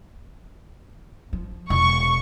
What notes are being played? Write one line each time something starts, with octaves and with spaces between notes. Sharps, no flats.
F3
E1 C#6